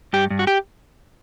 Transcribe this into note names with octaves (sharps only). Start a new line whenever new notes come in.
G2 G4
G2
F#4
G4